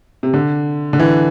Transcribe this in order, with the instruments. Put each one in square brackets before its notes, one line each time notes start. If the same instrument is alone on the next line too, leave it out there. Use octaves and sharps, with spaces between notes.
[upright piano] C3
D3
D3
E3